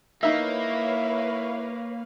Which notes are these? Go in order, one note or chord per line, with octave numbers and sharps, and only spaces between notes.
A#3 D#4 E4 B4 C#5 E5 F5